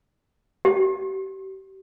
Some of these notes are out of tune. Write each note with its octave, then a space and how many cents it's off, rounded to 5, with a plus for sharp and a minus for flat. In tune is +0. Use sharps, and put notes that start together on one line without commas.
G4 -40